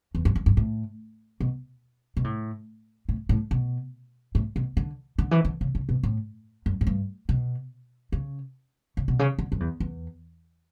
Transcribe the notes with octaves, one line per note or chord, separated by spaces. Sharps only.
E2
G2
G2
G2
A2
B2
B2
A2
A2
A2
B2
A2
B2
D3
D3
E3
D3
C#3
C#3
B2
A2
F#2
A2
G2
B2
C#3
C#3
B2
C#3
D3
F#2
E2
E2